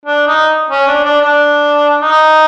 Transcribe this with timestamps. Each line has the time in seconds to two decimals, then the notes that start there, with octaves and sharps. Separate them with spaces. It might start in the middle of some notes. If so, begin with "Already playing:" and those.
0.05 D4
0.27 D#4
0.70 C#4
0.87 D4
1.05 D4
1.21 D4
2.03 D#4